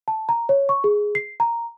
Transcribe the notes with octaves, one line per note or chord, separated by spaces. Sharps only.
A5
A#5
C#5
C#6
G#4
C7
A#5